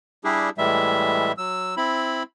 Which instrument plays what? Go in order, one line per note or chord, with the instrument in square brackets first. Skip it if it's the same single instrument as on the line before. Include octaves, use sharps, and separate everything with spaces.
[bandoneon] G3 D4 E4 G4 G#4
A2 E3 G3 G#3 E5
F#3 E6
C4 E4 B5